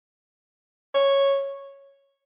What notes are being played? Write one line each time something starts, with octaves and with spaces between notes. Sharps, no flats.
C#5